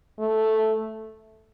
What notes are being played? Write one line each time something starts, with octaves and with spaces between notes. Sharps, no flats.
A3